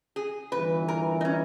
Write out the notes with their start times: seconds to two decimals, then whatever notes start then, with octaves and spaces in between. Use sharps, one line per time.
0.16 G#4
0.52 G1 G2 E3 B4
0.88 A#4
1.21 D#4
1.25 C#4